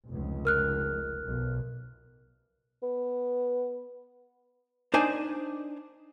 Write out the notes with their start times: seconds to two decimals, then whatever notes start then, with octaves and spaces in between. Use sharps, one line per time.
0.10 F1 C#2
0.45 A#4 F6 F#6
1.27 B1
2.83 B3
4.94 D4 D#4 C5 D5 G#5